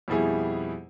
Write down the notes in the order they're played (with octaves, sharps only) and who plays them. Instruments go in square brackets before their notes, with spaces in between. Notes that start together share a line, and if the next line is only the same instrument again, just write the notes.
[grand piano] F2 B2 G3 E4 G#4